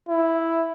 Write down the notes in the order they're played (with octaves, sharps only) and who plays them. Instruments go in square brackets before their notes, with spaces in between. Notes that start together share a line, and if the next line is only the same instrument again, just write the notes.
[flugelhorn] E4